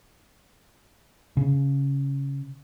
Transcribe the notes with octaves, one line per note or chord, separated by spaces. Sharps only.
C#3